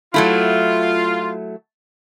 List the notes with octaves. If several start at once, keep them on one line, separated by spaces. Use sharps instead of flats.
F#3 A3 E4 F4